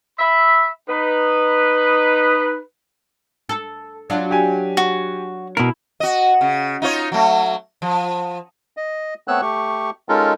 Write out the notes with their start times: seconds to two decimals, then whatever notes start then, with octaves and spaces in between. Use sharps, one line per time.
0.19 E5 B5
0.89 D#4 B4
3.49 A4
4.10 F#3 D4 F4
4.31 G4 G#5
4.77 F#4
5.57 B2 E4 A#4
6.00 F#4 D#5
6.41 C#3
6.82 D#4 F4 C#5
7.12 F#3 A3
7.82 F3
8.77 D#5
9.28 A3 B3 C4 C#5 E6 F#6
9.42 A3 G4 C#6
10.09 G#3 C#4 D#4 F4 A4 A#4